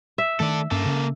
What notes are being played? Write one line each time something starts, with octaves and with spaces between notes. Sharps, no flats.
E5
D#3 A3 A4 D5
G2 A#3 C#4 A4
C#3 C#4